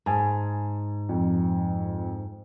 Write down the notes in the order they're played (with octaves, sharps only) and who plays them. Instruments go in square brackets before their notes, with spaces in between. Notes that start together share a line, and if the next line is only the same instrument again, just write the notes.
[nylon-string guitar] G#2 [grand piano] G#5 A5
[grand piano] F2